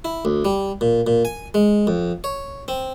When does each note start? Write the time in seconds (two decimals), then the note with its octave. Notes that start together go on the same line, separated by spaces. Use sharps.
0.05 E4
0.25 D2
0.45 G3
0.81 A#2
1.07 A#2
1.25 G#5
1.54 G#3
1.87 F2
2.24 C#5
2.68 C4